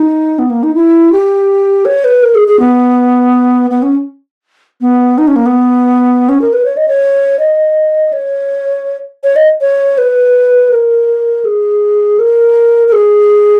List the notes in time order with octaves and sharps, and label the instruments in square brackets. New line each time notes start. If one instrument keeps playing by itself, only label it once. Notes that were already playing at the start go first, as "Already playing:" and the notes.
Already playing: [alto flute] D#4
B3
A#3
D#4
E4
G4
C#5
B4
A#4
G#4
G#4
B3
B3
C#4
B3
D#4
C#4
A#3
B3
C#4
A#4
B4
C#5
D#5
C#5
D#5
C#5
C#5
D#5
C#5
B4
A#4
G#4
A#4
A#4
G#4